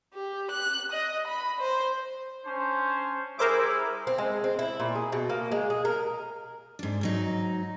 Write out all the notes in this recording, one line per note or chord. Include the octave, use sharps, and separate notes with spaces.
G4
F#6
D#5
B5
C5
C#4 D4 C5
G3 E4 G#4 A#4 C5 D6 E6
C4
G#3
C4
E4
A#2
G#4
B2
A#3
G#3
G#4
A#4
G#2 D4
G#2 F#3 D#4